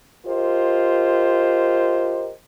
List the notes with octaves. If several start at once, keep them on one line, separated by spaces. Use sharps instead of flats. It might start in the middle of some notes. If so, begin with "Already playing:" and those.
F4 G4 A#4 C5 D#5